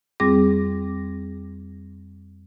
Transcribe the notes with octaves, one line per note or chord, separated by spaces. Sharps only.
F2 G3 C4 G#4 D6 A#6